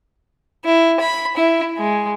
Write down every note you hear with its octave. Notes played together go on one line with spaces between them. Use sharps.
E4
B5
E4
G#3